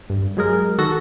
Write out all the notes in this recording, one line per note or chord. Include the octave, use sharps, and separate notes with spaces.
G2
F#3 G#3 G#4 A#4
D#3 F#4 A4 A#6